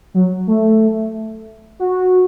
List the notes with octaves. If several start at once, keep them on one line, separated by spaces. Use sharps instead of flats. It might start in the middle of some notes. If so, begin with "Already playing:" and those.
F#3
A3
F#4